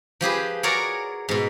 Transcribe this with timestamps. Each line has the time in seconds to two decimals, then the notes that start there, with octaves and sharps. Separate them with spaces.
0.21 F3 G4 G#4 B4
0.63 F#4 G#4 A#4 C#5 D5
1.29 G#2 B2